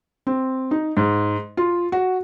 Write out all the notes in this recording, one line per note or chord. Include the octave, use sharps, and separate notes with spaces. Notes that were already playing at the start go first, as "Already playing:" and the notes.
C4
D#4
G#2
F4
F#4